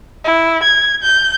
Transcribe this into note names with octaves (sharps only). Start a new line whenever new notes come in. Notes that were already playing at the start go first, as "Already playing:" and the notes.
E4
G#6
G6